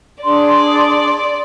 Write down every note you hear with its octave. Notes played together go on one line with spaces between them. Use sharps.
D4 G#4 D5 C6